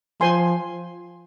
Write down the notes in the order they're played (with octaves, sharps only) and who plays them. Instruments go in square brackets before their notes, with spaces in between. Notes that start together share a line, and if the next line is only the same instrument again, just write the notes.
[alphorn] F3 [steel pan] C5 G#5 C6